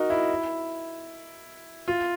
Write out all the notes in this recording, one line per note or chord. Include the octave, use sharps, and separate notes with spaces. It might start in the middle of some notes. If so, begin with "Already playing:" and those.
Already playing: D#4 F#4 A#4
E4
F4